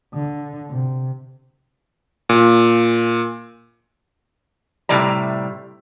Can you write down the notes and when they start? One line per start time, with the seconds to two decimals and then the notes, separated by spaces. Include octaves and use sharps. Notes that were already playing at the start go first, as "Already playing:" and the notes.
0.14 D3
0.69 C3
2.29 A#2
4.89 A2 C3 G3 D5 A#5